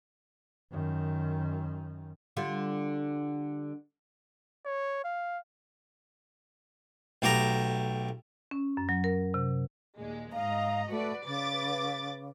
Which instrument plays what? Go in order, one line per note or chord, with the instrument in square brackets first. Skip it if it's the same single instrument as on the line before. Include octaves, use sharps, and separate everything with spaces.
[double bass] F#2 D#3
[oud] D3 G3 F4
[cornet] C#5
F5
[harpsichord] B1 A3 G4 A#5
[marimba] C#4
F#2
F#3
A#4
C3
[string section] D#2 A#2 G#3
[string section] G#2 D#5 A#5 [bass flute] F5
[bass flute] A3 [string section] F#4 B4 D5
[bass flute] C#3 [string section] B4 D6 A6